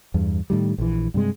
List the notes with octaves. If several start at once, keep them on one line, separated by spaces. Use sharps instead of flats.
E2 G2
A2 D#3 G3
A#1 E3
G2 C3 G#3